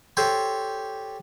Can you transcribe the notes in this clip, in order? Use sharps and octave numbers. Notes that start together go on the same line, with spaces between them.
G4 A4 C5 C#5